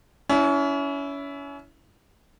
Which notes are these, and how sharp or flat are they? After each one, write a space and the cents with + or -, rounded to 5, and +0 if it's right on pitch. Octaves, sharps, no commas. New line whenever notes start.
C#4 +30 E4 +0